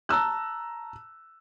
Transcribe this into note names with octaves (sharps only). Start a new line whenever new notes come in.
A5 A#5 E6 F#6